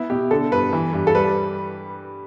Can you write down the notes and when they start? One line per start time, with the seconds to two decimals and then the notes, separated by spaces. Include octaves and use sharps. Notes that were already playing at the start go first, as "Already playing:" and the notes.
Already playing: B3 E4
0.10 B2 G4
0.31 D3 A4
0.51 G2 B4
0.73 E3
0.93 G2
1.07 A4
1.15 G3 B4